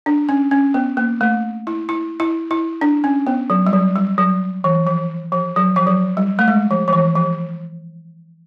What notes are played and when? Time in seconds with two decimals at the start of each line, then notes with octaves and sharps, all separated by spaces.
0.06 D4
0.29 C#4
0.51 C#4
0.74 B3
0.97 A#3
1.21 A3
1.67 E4
1.89 E4
2.20 E4
2.51 E4
2.81 D4
3.04 C#4
3.27 B3
3.50 F#3
3.66 G3
3.73 F#3
3.96 G3
4.18 F#3
4.64 E3
4.87 F3
5.32 F3
5.56 F#3
5.76 F3
5.87 F#3
6.17 G3
6.39 A3
6.48 G#3
6.71 F3
6.88 F3
6.93 E3
7.15 F3